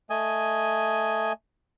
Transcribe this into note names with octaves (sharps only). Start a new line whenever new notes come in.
A3 D#5 G#5